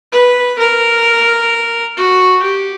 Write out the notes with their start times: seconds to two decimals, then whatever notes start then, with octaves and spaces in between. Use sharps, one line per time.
0.12 B4
0.59 A#4
1.97 F#4
2.42 G4